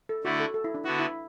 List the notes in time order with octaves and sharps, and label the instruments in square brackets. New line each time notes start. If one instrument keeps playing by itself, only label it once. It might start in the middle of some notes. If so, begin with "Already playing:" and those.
[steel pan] A4
[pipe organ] D3 A3 E4 [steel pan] F#4
[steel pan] A4
A4
E4
D4
[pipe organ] D3 B3 F#4 [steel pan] E4
[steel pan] E4